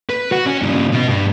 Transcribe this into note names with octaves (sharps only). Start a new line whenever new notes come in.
B4
F#4
C#4
G2 C#3
B2 D#5
G2